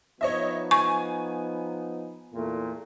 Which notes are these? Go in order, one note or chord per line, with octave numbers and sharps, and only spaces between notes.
F3 B3 D#4 C#5 D#5 E5
G#5 C#6
E2 A#2 A3